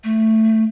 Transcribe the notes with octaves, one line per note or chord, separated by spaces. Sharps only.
A3